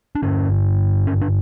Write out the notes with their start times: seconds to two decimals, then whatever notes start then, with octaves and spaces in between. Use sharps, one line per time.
0.15 D4
0.22 G2 D3 C#4
1.07 C#4
1.22 D4